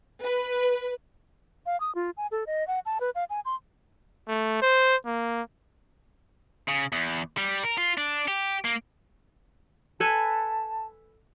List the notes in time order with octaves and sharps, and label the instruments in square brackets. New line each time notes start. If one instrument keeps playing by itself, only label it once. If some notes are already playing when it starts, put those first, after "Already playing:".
[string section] B4
[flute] F5
D#6
F4
G#5
A4
D#5
F#5
A5
B4
F5
G#5
C6
[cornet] A3
C5
A#3
[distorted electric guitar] C#3
E2
G3
A#4
F4
D4
G4
A#3
[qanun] A4 B4 G#5 [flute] A5